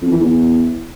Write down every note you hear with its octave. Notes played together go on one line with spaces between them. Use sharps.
F2
E3
E2